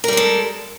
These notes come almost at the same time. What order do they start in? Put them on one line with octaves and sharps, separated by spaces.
A#4 G3 G#3 A4